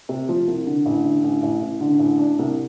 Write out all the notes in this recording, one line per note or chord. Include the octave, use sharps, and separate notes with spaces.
C3
F3
C2
D3
A1
D3
A1
A1
A1
D3
A1
D4
C2